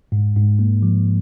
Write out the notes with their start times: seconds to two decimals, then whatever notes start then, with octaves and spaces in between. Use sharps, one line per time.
0.12 G#2
0.36 G#2
0.59 A#3
0.82 F3